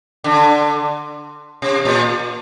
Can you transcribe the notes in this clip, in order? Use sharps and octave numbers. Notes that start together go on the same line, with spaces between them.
D3
C3
A#2